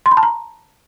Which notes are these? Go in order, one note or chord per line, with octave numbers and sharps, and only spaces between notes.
C6
B5
A5
A#5